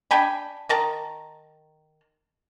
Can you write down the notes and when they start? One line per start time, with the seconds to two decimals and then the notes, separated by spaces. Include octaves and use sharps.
0.11 D4 G5 G#5 B5
0.69 D#3 A#4 A5